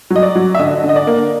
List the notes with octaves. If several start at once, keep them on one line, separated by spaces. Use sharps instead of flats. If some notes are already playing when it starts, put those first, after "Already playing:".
F#3
D#5
D5
F#3
E5
D3 D#5
D3
D#5
D5
A#3